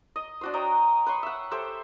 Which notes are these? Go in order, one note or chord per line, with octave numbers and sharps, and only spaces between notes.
D#5
D4 F#4 C5
C#5 D#5 G5 A#5
B4 C#5 C6 C#6
E5 F#5
G4 A4 C5 E5